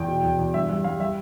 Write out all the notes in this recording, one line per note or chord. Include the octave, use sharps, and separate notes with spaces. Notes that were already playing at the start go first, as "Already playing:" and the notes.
Already playing: E2 G5
B2
E2
E2
G2 E5
G3 E5
G3 F5
G3 E5